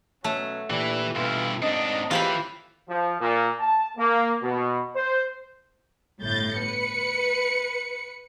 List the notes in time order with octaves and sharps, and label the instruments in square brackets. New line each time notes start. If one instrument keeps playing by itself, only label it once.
[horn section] B2 F#3 C#4 [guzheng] A3
[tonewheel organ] A#2 G4 [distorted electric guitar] E3 [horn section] D4 E4
[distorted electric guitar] G2 E4 [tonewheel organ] B2 [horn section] E3 F4
[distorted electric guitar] G#2 D4 [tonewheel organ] C4 A#5 [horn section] D#5
[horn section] A2 G#3 G4 [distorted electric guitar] E3 [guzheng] F4 C5 B5
[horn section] F3
A#2
A5
A#3
B2
C5
[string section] G1 A2 G6 A6
B4 C#7